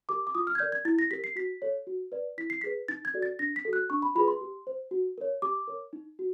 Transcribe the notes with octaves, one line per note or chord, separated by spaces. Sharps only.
G4 A#4 D6
D6
F4 D#6
F6
G#6
A#4 D5 G6
G#6
E4 A6
A#6
G4 A#4 B6
C7
F#4 B6
A4 C#5
F#4
B4 D5
E4 B6
C7
G#4 B4 B6
D#4 A6
G#6
F#4 A4 D5
A6
D4 A#6
B6
F#4 A4
F#6
D4 C#6
B5
F4 G#4 B4 B5
C6
G4
C5
F#4
A#4 C#5
G4 D6
A#4 C#5
D#4
F#4